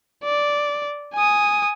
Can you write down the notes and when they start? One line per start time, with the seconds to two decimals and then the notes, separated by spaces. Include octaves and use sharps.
0.24 D5
1.14 G#5 D#6